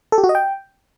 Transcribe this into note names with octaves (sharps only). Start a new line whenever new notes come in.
A4
G4
F#4
D#5
G5